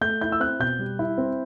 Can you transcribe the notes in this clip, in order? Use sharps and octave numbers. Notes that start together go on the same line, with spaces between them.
A3 G6
E4 G6
E6
C4 F#6
B2 G6
G3
E4
C4